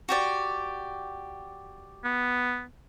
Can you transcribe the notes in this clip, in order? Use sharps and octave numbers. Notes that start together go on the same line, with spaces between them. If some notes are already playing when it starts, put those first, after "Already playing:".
F#4 G4 D5
B3